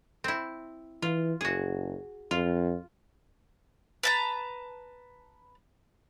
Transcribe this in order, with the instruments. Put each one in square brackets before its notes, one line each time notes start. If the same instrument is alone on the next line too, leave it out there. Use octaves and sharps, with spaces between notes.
[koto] C4 E4
[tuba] E3 [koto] F4
[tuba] F#1 [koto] F#4 G#4
[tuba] F2 [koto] F4
[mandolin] B4 A5 A#5